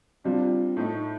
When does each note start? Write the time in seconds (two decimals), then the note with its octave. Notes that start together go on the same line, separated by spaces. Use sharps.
0.24 C3 G3 D4 F4
0.77 A2 A3 D#4